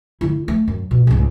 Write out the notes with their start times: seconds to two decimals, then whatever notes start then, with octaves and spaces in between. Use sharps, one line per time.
0.21 D3 E4
0.48 A3
0.68 F#2
0.91 B2
1.07 C#2 G#2